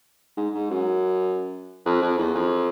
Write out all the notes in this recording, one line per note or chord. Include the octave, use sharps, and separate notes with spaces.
G#2
G#2
F#2
F2
F2
E2
F2